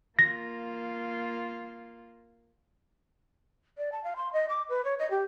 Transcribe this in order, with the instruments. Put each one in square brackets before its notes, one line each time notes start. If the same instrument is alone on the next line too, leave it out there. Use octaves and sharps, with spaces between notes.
[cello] A#3 F4 [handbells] A#6
[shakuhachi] D5
A5
F5
C6
D#5
D6
B4
C#5
D#5
G4